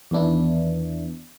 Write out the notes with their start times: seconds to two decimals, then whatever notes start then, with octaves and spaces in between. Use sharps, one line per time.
0.11 E2 D#3 B3 D4 E4